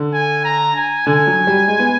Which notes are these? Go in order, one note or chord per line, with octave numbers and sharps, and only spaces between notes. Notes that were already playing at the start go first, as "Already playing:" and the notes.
Already playing: D3
G#5
A#5
G#5
D3 G#5
F#3
G3
G#3
B3